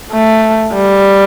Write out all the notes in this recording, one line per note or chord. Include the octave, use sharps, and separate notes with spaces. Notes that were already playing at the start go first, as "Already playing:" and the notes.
A3
G3